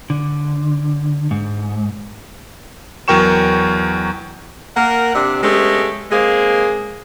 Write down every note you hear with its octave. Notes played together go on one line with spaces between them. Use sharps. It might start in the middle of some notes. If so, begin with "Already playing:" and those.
D3
G#2
E2 F#3 A#4 G5 C#6 E7
A#3 A#4 F#5
C3 D4
G#3 A3 B3 C#4 G4
G#3 A#3 C4 G#4